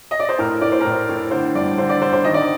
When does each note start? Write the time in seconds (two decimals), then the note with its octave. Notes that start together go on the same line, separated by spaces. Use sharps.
0.11 D#5
0.19 D5
0.29 C5
0.39 A2 A#4
0.61 A2 D5
0.72 C5
0.81 A2 A#4
0.91 C5
1.09 A2
1.31 D3 C5
1.55 G2 D5
1.78 D3 C5
1.89 D5
2.01 D3 C5
2.13 C5
2.24 D#3 D#5
2.34 D5